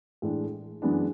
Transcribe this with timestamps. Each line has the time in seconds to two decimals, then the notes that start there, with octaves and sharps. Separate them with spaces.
0.22 A2 E3 G#3 D4
0.82 F#2 E3 G#3 B3 D4